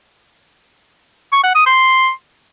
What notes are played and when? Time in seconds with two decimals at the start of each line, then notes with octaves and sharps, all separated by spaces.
1.32 C#6
1.44 F#5
1.55 D#6
1.66 C6